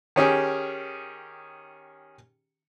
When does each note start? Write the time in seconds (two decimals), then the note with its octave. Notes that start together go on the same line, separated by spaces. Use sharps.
0.16 D#3 C#4 G4 G#4